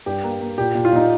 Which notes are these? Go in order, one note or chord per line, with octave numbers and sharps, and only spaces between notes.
G2 G4
A#3
A#3
A#2 G4
A#2
F4
A#2 D#4